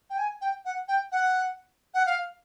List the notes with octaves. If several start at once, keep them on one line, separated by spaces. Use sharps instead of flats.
G5
G#5
G5
F#5
G5
F#5
F#5
F5